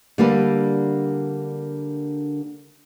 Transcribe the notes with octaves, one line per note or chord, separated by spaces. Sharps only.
D3 G3 A#3 D4 G4 B4